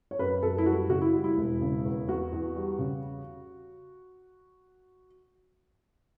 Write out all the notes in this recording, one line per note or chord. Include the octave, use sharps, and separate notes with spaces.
C#5
F#2 B4
F#2 A4
E4
G3 F#4
C#3 F#4
E4
G3
E4
E1
C#3
E2
E2 F#4
E2
G3
C#3